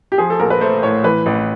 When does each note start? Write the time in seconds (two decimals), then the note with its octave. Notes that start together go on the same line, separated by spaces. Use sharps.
0.12 G4
0.18 F3 G#4
0.30 A4
0.40 A#1 A#4
0.50 B4
0.61 A3 C5
0.83 A2 C#5
1.04 E3 B4
1.26 A1